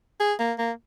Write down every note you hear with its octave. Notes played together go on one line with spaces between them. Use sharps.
G#4
A#3
A#3